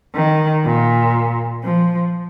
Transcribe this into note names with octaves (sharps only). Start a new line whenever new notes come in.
D#3
A#2
F3